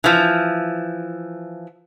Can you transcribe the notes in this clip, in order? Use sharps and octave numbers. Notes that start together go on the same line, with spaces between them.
E3 F3